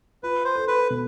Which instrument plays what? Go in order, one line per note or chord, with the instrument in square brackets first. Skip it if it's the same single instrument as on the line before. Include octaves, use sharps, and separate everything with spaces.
[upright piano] F4 [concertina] B4
[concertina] C5
[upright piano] A4
[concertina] B4
[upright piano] B2